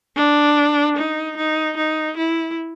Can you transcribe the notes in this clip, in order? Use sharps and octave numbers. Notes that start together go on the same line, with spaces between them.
D4
D#4
D#4
D#4
E4